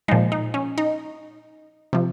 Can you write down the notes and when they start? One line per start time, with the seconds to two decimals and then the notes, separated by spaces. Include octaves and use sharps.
0.08 A#2 F3 G#3 D#4
0.32 D#4
0.54 C#4
0.78 D#4
1.93 C3 F3